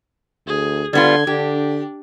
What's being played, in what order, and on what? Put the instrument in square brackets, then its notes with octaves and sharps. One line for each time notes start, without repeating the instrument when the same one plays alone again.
[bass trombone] D2 [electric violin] G#4
[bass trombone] D3 [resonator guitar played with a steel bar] G3 B3 F4 [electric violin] C6 G#6
[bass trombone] D3 [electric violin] D4 [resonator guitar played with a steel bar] G4